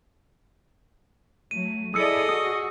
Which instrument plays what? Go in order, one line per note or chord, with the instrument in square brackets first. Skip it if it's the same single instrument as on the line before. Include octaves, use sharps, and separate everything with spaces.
[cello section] F#3 A3 [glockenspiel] D#7
[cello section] E4 A4 D5 [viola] G#4 D#5 [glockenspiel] D#6 E6 C#7
[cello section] F#4 [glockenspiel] D#6